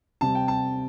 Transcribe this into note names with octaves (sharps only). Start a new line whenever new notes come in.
C3 G3 C4 A5
G5
A5